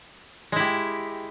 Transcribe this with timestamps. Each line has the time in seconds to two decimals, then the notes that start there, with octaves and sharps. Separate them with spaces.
0.52 G#3
0.56 E4
0.60 G4